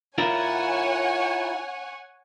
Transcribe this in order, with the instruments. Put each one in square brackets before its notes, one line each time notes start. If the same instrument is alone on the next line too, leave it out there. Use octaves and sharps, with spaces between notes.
[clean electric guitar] E4 F4 A#4 [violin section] C#5 F#5 G#5